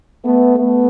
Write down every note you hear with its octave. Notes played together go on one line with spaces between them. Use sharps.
A3 B3
A3 B3